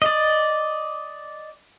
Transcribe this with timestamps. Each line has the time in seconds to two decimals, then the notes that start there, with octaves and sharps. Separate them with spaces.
0.02 D5 D#5